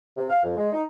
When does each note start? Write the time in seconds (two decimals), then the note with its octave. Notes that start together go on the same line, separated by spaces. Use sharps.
0.17 C3
0.29 F5
0.43 F2
0.57 G#3
0.73 D#4